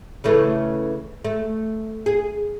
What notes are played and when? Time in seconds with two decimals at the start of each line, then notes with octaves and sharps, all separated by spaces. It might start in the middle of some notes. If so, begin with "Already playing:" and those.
0.24 C#3 E3 A3
1.25 A3
2.06 G#4